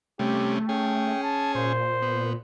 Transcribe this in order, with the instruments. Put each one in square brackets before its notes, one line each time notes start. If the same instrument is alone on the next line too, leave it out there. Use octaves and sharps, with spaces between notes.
[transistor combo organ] C3 G3 C#4 [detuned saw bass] A3 [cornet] G4
[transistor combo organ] C#4 G#4 [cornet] G5
[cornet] A5
[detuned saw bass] A#2 [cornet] C5
[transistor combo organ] B3